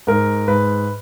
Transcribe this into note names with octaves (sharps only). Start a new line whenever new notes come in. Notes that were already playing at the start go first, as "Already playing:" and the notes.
G#2 A#4
G#2 B4